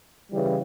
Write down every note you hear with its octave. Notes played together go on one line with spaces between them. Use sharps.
C#3 E3 G3